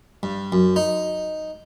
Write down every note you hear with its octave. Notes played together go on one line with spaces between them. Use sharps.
G2
F#2
D#4